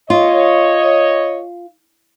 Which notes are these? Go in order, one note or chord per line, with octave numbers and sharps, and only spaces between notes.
F4 C#5 D#5